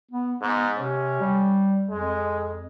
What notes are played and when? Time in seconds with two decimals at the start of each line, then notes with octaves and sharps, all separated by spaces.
0.11 B3
0.41 G#2 B3
0.78 C3 C#4
1.21 G3
1.90 F2 G#3